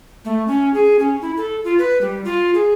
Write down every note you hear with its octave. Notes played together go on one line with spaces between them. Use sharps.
A3
C#4
G#4
C#4
E4
A4
F4
B4
G3
F4
G#4